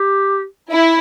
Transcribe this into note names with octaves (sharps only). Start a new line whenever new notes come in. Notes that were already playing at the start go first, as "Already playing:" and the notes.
Already playing: G4
E4